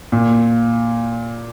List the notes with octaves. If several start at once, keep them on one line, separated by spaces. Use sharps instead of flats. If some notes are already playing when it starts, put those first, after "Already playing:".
A#2